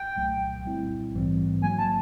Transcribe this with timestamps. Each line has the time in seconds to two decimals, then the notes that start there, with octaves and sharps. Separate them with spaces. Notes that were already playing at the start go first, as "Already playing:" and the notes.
Already playing: G5
0.16 C2 A#2 F#3 A3
0.65 A#2 G3 C4 E4
1.14 A#1 G#2 E3 G3 C4
1.62 D#3 F#3 A#3 G#5
1.78 A5